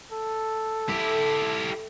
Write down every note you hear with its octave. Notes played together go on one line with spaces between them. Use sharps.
A4
A3 E4 G4